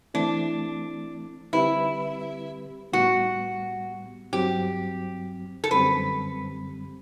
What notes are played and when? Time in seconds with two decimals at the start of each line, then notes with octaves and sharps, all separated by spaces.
0.14 E3 A3 C4 D4 E4
1.53 D3 G3 C4 E4 G4 B4
2.92 A2 G3 B3 F#4
4.32 G2 F#3 C4 G4
5.64 A4
5.71 F#2 D3 G3 C4 B4